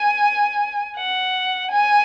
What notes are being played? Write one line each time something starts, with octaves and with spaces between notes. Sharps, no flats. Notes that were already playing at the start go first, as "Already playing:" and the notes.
Already playing: G#5
F#5
G#5